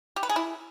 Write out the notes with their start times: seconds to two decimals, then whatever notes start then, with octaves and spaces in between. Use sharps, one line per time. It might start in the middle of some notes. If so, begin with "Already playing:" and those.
0.16 G4
0.23 B4
0.29 G#4
0.36 E4